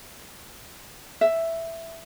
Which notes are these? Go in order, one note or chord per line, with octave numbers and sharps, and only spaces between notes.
E5